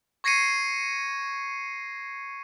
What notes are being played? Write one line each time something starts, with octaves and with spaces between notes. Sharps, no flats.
C#6 G#6 A#6 C7 C#7 D#7